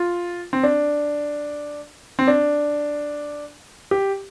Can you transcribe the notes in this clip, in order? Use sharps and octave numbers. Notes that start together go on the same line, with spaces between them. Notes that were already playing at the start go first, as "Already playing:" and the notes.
Already playing: F4
C4
D4
C4
D4
G4